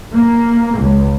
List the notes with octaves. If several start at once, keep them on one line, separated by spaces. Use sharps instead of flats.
A#3
C#2